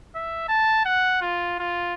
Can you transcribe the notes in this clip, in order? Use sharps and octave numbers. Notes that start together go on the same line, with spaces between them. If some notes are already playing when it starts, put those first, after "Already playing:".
E5
A5
F#5
F4
F4